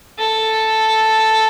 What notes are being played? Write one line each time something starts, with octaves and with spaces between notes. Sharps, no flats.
A4